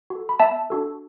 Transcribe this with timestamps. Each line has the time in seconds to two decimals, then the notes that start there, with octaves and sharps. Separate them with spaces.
0.10 F#4 A4
0.29 B5
0.40 B3 E5 A5
0.70 D4 F#4 A4